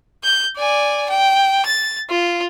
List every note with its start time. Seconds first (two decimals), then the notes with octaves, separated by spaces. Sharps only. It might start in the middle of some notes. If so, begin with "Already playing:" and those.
0.24 G6
0.57 D5 G#5
1.10 G5
1.66 A6
2.10 F4